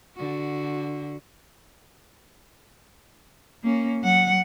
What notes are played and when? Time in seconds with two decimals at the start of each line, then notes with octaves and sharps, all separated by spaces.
0.16 D3 F#4
3.63 A#3 C#4
4.01 F#3 F#5